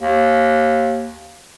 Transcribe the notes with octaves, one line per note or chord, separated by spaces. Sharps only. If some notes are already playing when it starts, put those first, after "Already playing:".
D#2